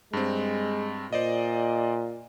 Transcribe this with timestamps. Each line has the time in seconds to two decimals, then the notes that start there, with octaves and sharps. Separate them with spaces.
0.13 G2 G#3 C4
1.13 A#2 C5 D5 D#5